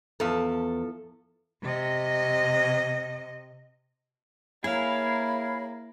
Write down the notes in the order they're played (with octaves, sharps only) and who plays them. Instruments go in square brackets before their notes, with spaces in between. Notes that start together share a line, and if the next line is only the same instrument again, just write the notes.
[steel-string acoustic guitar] E2 [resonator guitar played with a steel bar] F3 A4
[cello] C3 D#5
[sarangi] A#3 [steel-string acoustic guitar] E4 [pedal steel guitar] G#4 F5 [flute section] C#5 A#5 B5